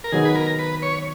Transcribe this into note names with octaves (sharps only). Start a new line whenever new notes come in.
A#4
D#3 F#3 B3 D#4 G#4
B4
A#4
B4
C#5